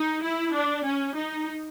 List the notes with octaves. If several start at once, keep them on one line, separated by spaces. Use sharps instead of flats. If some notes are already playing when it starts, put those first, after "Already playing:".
Already playing: D#4
E4
D4
C#4
D#4